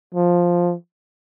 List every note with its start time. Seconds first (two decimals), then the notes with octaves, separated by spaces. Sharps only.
0.15 F3